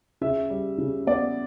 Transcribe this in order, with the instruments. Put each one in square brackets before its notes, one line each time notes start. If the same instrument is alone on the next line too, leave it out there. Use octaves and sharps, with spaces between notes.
[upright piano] C#3 E5
G3
C#3
B3 D5